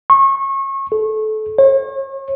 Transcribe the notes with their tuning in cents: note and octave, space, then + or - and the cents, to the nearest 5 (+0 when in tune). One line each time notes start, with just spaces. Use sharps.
C#6 -30
A4 -25
C#5 -40